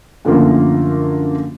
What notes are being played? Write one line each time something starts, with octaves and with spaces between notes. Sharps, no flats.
F#2 D3 F3 A3 A#3 F4